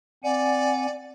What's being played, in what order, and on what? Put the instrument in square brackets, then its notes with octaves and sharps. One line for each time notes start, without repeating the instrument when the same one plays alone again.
[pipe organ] C4 F#5 G#5 [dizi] D5